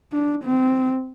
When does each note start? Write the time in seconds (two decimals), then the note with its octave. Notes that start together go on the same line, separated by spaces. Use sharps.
0.13 D4
0.44 C4